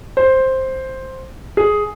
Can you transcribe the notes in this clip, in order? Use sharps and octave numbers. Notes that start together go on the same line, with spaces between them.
C5
G#4